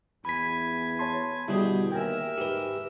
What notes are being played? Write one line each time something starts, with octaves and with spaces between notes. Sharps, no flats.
E2 G#5 B5 B6
C#5 A5 C6
B2 D3 G3 E4 G4 G#4
D#2 A#4 E5 G5 G#5
G#2 G4 B4